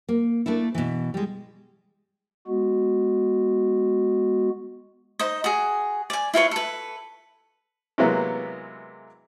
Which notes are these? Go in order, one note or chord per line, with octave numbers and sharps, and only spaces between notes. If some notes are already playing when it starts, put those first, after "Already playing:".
A#3
A3 A#3 D4 E4
B2 E3
G3 G#3
G#3 B3 F#4
D#4 C5 D#5
F#4 G#4
D5 G#5
E4 F4 B4 C#5
A4 B4
C3 E3 F#3 G#3 A#3 B3